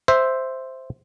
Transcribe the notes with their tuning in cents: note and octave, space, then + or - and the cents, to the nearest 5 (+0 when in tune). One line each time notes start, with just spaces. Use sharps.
C5 +0 E5 +0